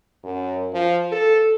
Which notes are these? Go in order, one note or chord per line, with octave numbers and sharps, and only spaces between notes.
F#2
F3
A4